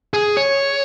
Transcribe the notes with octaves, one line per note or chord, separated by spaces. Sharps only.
G#4
C#5